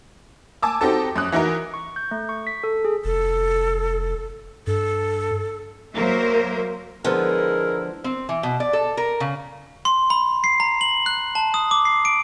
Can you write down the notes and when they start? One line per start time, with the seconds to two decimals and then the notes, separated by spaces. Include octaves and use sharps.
0.63 G#5 A5 D6 E6
0.81 C4 D#4 F#4 G4 A4 A5
1.16 F#2 D#6 F#6
1.32 E3 D#4 E4 F#4 A#4
1.74 C#6
1.96 G6
2.11 A3
2.29 C#6
2.47 B6
2.64 A4
2.85 G#4
3.05 F1 A4
4.67 G2 A4
5.95 F#3 A#3 A#4 C5 E5
7.04 D3 F3 G#3 B3 E4 A#4
8.04 C4
8.29 E3
8.43 B2
8.60 D5
8.73 A4
8.97 A#4
9.20 C#3
9.85 C6
10.10 B5
10.44 C7
10.60 A#5
10.81 F#7
11.06 F#6
11.35 A5
11.54 D#6
11.71 D6
11.85 C7
12.05 D7